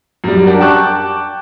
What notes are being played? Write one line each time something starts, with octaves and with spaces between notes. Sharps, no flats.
F#2 G3
D4 F#4 G4 A#4
G5 A5 C#6 D6 F#6